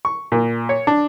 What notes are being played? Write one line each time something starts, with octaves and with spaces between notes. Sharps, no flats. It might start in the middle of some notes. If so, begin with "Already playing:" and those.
C#6
A#2
C#5
D4